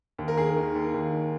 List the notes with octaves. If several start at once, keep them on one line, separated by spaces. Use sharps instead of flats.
D#2
A#4
D#3 G#4
A#4
D#3
D#2
D#2
D#3